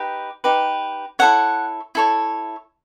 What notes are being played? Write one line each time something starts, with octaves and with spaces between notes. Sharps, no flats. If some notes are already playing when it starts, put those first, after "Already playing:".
Already playing: D#4 G4 B4
D#4 G4 B4
E4 A4 C#5 F#5
E4 A4 C#5